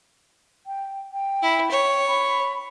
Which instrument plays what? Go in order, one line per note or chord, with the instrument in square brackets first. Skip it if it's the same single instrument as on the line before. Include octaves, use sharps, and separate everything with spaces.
[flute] G5
G5
[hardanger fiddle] E4
C#5
[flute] B5